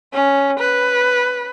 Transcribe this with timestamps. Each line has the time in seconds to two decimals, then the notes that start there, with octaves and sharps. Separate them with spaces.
0.13 C#4
0.60 B4